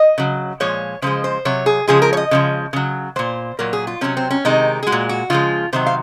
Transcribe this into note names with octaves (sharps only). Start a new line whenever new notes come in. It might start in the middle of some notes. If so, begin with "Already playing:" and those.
Already playing: D#5
C#3 F#3
A#2 F3 G#3 C#5
C#3 F3 G#3 C5
C5
C3 F#3 C#5
G#4
C#3 F3 G#3 G#4
A#4
C#5
D#5
C#3 F3 G#3
C#3 F#3
A#2 F#3 C5
A#2 F#3 A#4
G#4
F4
C3 D#3 F#3 C#4
C4
C#4
C3 D#3 G#3 D#4
G#4
G#3 F#4
A#2
F#4
C#3 F3 G#3 F4
C3 D#3 F#3 C5
F5